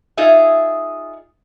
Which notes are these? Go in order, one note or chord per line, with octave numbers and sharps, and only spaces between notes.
D#4 F4 G#4 D#5 E5